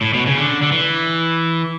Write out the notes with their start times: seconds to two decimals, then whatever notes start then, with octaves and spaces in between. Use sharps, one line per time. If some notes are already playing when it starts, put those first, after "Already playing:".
0.01 A2
0.13 B2
0.26 C#3
0.38 D3
0.62 D3
0.72 E3